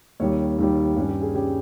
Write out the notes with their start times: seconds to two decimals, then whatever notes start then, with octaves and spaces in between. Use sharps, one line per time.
0.20 D#2 D#3 G3 C#5
0.58 D#2 D#3 G3
0.96 G2 G3 C#4
1.08 G4
1.22 G#4
1.35 G3 C#4 G4